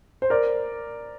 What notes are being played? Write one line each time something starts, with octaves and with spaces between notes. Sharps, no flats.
C5
A#4 D5